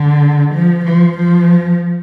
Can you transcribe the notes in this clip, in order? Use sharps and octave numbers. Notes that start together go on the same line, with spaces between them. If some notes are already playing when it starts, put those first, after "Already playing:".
Already playing: D3
F3
F3
F3